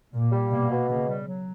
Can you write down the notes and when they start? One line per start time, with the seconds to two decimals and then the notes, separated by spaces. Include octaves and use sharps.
0.13 A#2 A#3
0.32 G3
0.51 B2 A#3
0.71 B2
0.89 C#3 A#3
1.08 G3
1.27 F#3